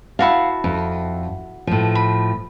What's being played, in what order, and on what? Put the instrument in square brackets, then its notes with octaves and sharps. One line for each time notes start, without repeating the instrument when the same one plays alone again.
[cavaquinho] E4 F#4 A5 [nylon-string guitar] F5
[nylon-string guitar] F2
A2 F3
[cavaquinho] B5